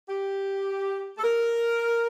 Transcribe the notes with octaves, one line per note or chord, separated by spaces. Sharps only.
G4
A4
A#4